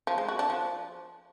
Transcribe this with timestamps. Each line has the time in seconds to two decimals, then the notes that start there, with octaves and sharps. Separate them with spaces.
0.07 F3
0.18 G#3
0.28 F#4
0.39 D4
0.50 F3